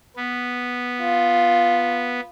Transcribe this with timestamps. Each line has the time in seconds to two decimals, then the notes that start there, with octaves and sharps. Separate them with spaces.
0.16 B3
1.02 F4